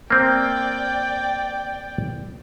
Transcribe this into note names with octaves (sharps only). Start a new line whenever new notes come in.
A#3 C4 D5 G5